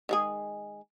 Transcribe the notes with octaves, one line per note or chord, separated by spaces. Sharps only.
D#3 G#3 G#4